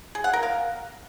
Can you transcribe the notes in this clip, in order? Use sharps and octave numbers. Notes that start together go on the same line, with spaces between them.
G#4
F#5
A#4
F5